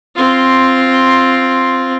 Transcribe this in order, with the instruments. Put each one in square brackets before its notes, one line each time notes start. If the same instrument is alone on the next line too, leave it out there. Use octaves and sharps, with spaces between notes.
[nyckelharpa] C4 F4